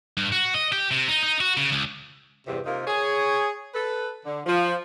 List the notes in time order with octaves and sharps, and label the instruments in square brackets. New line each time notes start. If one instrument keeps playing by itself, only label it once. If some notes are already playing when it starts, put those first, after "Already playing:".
[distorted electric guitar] G2
F#4
D#5
G4
C3
D#4
D#4
F#4
C#3
C#2
[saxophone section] E2 G2 C3
C3 A#3 D#4 F4
G#4 C#5
A4 B4
D3
F3